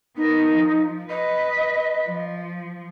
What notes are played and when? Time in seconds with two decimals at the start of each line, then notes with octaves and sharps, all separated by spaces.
0.17 B3 D#4 A#4
0.52 F3
1.10 B4 D#5
2.05 F3